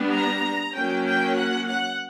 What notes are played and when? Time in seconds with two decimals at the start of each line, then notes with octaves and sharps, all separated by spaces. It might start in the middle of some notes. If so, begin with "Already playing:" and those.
Already playing: G3 B3 D4
0.14 A#5
0.75 F#3 A#3 C#4 G5
1.06 G5
1.37 F#5
1.67 F#5